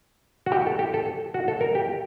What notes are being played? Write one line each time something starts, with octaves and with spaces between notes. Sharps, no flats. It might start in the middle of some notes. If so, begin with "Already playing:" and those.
F#4
G4
A4
G4
A4
F#4
A4
A#4
G4